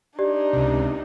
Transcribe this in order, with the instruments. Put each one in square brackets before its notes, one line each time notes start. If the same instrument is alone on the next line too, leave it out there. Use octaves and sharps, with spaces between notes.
[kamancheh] D4 D#4 [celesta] G4 D5
[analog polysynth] C#2 C3